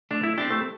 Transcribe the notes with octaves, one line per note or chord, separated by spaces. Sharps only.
A3 D4
E4
C4 D4 E4 G4
A3